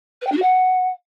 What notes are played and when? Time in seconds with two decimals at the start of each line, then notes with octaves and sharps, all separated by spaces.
0.21 B4
0.26 G5
0.31 D4
0.37 F#4
0.42 F#5